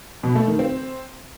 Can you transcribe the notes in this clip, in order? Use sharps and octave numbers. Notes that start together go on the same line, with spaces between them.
B2
A3
D#3
C4